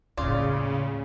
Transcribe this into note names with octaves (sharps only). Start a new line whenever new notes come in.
D#2 A2 C#3 F4 D5